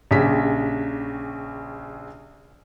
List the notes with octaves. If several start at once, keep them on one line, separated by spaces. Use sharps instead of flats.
A#1 C#3 G4 B6